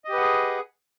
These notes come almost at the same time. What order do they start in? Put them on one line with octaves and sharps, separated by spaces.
D#5 G4 B4 F#5 G#4